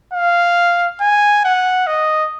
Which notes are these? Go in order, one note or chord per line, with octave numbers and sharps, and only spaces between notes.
F5
G#5
F#5
D#5